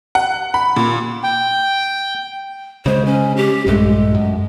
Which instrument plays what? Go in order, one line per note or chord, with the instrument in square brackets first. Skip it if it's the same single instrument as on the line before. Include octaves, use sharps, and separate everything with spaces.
[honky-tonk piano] F#5
B5
A#2
[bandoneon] G5
[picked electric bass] C#3 G#3 [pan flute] C5
[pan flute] C#4
G4
[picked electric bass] A#1 G2 A3 [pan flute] G#3
[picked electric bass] F#2